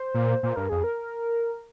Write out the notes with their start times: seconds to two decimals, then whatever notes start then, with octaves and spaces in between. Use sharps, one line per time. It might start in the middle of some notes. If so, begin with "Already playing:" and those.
Already playing: C5
0.14 A#2
0.43 A#2 C5
0.56 G2 A#4
0.69 F2 G#4
0.84 A#4